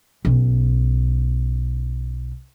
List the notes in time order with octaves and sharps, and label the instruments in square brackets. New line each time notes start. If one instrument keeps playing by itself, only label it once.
[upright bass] B1 C#4